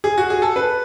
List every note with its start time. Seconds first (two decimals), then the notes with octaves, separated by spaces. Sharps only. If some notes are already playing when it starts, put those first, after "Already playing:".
0.04 G#4
0.18 F#4
0.30 G#4
0.42 A4
0.56 B4